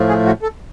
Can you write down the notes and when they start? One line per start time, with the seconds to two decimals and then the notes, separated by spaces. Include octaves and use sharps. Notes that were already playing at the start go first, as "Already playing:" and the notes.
Already playing: A2 F3 A3
0.08 G#4
0.26 F#4
0.43 A4